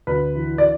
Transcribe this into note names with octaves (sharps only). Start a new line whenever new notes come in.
D2 B4
E3
D5